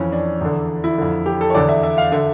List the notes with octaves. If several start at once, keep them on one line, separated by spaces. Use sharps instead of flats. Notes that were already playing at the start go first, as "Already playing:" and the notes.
Already playing: F2 E3 C#4
D4
E2 D3
E4
F2 D3
G4
A4
C#5
E2 D3 D5
E5
E5
F5
D3 E5